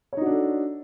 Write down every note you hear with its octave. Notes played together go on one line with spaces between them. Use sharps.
D4 D#4 F#4 A4 C#5